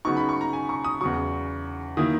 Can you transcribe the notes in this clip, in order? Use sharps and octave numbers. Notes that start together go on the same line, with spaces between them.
C#3 F#3 B3 D#4 C#6
B5
C#6
A#5
G#5
C#6
D#6
E2 C#3 F#3 C#6
D#3 F#3 A#3 E4 D#6